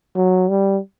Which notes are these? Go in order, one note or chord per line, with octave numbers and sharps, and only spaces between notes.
F#3
G3